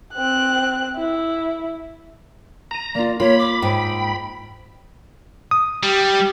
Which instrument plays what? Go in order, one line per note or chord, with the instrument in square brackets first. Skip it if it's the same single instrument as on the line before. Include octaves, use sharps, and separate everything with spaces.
[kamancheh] C4 F#6
E4
[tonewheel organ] A#5 [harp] D#7 E7
[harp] A#3 F4 [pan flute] D5
[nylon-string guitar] A#3 [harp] F4 [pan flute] C#5 [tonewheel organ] B5
[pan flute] D6
[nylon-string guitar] G#2 [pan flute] G5
[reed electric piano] D#6
[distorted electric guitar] G3 [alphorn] G4